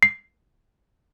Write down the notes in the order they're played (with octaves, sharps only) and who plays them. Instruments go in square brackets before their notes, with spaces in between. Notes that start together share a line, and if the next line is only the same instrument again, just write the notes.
[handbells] C7